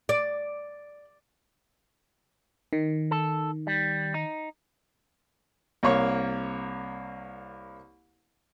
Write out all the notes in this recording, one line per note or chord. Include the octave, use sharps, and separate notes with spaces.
D5
D#3
A4
G3
D#4
C2 A#3 C#5 C#6